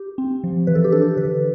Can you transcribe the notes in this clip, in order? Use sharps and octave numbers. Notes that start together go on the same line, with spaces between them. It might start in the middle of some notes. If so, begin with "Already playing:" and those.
Already playing: G4
C4
F3
E3 B4
A4
G4
D4 A4
D3 B4